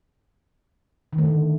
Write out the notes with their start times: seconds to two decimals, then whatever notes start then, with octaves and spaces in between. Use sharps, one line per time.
1.13 D#3
1.18 A3
1.24 D3